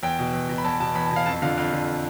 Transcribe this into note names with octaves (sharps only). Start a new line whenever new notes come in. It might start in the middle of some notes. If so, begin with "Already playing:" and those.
E2 G5
B2
E2
B2
B5
E2 A5
B2 A5
E2 B5
A5
B2
F5
F2 A5
D3 F3 F5
F2 F5
D3 F3